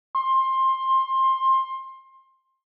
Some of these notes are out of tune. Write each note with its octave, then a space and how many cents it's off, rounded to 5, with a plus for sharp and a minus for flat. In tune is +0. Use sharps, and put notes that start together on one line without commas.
C6 +20